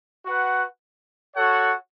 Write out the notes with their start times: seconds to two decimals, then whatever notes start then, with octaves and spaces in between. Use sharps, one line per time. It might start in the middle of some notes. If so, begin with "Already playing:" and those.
0.25 F#4 B4 F#5
1.35 F#4 A4 C#5 F#5